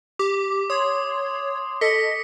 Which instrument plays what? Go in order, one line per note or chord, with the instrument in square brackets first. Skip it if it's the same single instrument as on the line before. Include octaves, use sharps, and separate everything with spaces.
[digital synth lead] G4 [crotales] D6
[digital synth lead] C#5 [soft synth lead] C6 [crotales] D#6
[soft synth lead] A4 [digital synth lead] D#5 [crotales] B6 C#7